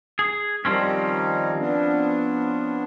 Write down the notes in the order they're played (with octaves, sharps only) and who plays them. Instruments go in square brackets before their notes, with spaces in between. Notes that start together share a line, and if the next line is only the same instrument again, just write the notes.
[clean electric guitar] G#4
[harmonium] D#3 G3 D#4 [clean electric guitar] F3 C4 C#4
[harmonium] B3 D4